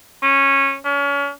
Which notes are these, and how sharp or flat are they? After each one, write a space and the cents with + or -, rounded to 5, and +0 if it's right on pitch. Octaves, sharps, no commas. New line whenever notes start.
C#4 -15
C#4 +35